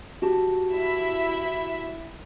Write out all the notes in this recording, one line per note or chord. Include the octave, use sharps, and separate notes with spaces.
F#4 G4 A5
E4 E5